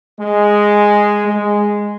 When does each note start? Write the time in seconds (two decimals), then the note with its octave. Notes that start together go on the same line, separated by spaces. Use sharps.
0.20 G#3
1.27 G#3